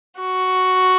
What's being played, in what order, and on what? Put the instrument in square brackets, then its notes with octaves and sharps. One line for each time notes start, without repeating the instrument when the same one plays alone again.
[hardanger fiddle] F#4